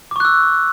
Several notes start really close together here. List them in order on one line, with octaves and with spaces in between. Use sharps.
D6 C#6 F#6 E6